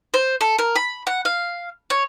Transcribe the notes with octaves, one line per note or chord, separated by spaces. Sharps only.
C5
A4
A#4
B5
F#5
F5
C#5